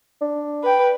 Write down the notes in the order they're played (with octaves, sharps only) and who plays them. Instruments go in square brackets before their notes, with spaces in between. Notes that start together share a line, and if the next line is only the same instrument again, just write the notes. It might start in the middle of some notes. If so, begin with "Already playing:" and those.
[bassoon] D4
[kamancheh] B4 G5